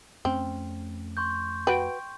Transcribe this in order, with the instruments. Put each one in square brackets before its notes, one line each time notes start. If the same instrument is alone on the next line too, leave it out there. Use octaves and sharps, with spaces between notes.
[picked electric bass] F2 A3 C#4 [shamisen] C4
[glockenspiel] C6 C#6 G6
[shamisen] F#4 B4 [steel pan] G5